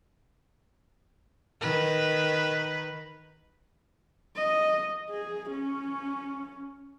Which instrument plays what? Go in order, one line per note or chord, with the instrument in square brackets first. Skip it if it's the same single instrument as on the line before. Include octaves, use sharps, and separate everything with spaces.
[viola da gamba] D#3 B4
[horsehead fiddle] D#5
G#4
C#4